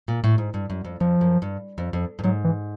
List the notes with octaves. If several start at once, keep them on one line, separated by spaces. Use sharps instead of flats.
A#2
A2
G#2
G2
F#2
F2
F2 F3
F#2
G2
F2
F2
G2
G#2 F#3
E3